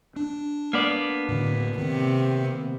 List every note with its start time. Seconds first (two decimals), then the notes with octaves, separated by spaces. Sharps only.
0.16 D4
0.73 A#3 B3 D5
1.29 A2 D3
1.78 C3 D#3